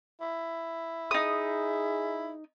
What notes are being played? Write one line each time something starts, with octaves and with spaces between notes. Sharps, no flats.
E4
D#4 G#4 D#6